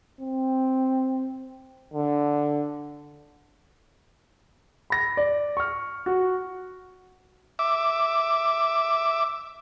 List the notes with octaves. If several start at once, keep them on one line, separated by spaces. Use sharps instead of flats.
C4
D3
B5 A#6
D5
C#6 F6
F#4
E5 D6